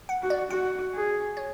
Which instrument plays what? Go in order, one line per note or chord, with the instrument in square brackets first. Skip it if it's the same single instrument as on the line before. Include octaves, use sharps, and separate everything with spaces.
[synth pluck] F#5
[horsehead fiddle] F#4
[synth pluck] D5
[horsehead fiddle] F#4 [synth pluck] F#5
[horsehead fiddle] G#4
[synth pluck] C#5